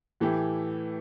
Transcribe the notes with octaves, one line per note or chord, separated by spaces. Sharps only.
A2 E3 A3 E4 G4